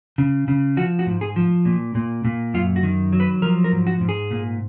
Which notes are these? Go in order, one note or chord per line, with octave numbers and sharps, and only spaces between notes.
C#3
C#3
F3 F#4
F#4
G#2
G#4
F3
A#2
A#2
A#2
F#2 F4
F#4
D#3
F#3
B4
F3 A#4
A#4
G#2
F#4
G#2
G#4
A#2